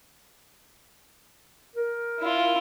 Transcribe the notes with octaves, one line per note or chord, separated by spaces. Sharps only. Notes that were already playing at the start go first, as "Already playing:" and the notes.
A#4
E4 F4